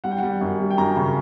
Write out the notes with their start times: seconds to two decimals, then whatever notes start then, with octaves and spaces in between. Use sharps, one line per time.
0.04 G3 F#5
0.11 G5
0.19 F#5
0.23 G3
0.41 F#2
0.60 G3
0.70 G5
0.78 F#2 A#5
0.96 C#3